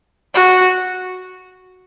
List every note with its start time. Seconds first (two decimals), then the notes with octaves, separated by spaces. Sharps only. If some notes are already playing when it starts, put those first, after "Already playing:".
0.34 F#4